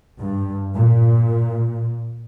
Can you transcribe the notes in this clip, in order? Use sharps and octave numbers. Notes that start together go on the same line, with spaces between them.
G2
A#2